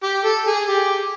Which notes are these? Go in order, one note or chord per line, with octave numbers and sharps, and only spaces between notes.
G4
A4
G#4
G4